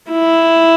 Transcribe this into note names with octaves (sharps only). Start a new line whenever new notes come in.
E4